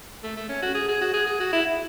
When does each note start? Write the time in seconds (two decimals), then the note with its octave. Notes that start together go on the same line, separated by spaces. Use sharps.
0.23 A3
0.37 A3
0.49 C#4
0.62 F#4
0.75 G#4
0.88 G#4
1.01 F#4
1.13 G#4
1.26 G#4
1.40 F#4
1.53 E4